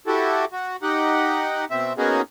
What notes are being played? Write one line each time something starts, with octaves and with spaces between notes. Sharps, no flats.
E4 F#4 G4 A4
F#4
D#4 G4 F#5
B2 C4 E5
A#3 B3 C#4 D#4 F#4 G#4